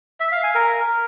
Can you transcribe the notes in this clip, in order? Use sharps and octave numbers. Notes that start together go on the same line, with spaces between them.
E5
F5
G#5
A#4